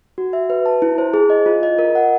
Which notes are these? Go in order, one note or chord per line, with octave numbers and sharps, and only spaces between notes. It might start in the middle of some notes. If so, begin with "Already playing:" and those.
F#4
E5
B4
A5
E4
C5
G#4
D#5
F4
D#5
A#4
F#5